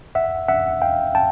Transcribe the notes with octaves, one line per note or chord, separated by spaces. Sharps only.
E5 F#5
E5 F#5
F5 G5
G5 A5